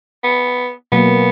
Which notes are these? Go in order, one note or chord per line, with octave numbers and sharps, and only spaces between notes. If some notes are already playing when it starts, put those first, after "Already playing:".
B3
B2 F#3 A#3 B3